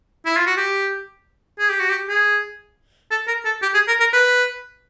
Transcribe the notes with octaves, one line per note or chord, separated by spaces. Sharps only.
E4
F4
F#4
G4
G#4
G4
F#4
G4
G#4
A4
A#4
A4
G4
G#4
A#4
A#4
B4